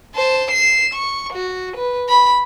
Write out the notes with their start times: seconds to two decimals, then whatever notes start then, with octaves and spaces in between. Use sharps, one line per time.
0.15 C5 A5
0.51 C7 E7
0.94 C#6
1.33 F#4
1.77 B4
2.09 B5